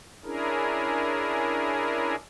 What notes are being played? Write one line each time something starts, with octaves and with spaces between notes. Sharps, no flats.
C#4 D4 E4 G#4 A#4